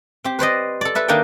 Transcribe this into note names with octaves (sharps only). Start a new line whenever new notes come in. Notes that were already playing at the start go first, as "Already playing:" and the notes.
C4 G4
B4 C5 D5 D#5
A4 D5
A4 B4 E5
D#3 A#3 D4 D#4 A4 G5